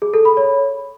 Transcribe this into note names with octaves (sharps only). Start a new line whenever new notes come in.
G#4
A4
B5
C#5